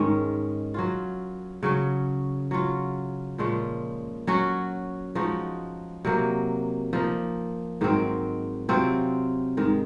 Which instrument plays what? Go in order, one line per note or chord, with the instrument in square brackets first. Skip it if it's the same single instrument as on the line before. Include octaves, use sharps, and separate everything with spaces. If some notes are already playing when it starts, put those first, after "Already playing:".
Already playing: [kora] G#2 D#3 G#3 C#4
F#3 C#4 F4
C#3 F#3 C#4
F#3 C#4 F4
A#2 F3 G#3 C#4
F#3 C#4 F#4
F3 G#3 D#4 F#4
C3 F#3 A#3
F3 A#3 D#4
G#2 D#3 F#3 C4
C3 F#3 C4 F4
G#2 D#3 G#3